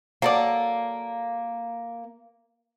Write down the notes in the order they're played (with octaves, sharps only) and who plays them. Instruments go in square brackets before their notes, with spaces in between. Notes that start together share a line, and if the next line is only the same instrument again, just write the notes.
[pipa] F#3 A4 D5 [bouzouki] A#3